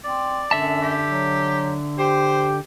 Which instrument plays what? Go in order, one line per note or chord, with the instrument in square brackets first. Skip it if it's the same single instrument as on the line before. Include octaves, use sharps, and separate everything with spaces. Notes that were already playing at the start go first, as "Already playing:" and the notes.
[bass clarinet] C4 [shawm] D5
[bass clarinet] F#2 [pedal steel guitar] D3 E5 A5
[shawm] G4
[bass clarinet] F#3
[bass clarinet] G4 [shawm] C5